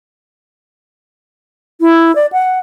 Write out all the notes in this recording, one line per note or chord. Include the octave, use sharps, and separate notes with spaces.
E4
D5
F#5